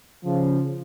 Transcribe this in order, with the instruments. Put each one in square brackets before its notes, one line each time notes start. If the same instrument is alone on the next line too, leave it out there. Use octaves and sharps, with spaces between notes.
[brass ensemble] C#3 F3